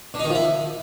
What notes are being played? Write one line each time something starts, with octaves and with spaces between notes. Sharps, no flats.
D3
D#4
D#3
F3
E4